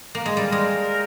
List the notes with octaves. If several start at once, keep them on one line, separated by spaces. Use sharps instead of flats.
A#3
G#3
G3 C4 D#4 A#4
G#3